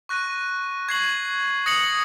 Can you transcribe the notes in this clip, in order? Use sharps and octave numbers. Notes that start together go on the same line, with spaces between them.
C#6 F#6 A#6 D#7
C#6 G#6 C7 F#7
D#6 A#6 C#7 F#7